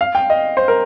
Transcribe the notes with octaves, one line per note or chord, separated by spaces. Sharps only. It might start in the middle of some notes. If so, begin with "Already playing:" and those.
F5
G5
D#5
C5
A#4